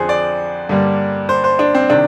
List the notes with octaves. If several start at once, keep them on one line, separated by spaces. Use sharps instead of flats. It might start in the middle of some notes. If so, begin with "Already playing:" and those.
Already playing: F2 D3 F3 G#4 C5
D5
G2 D3 G3 A#3
C5
C5
D4
C4
C3 D#3 D4